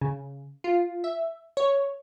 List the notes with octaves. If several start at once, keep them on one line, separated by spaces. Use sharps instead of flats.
C#3
F4
E5
C#5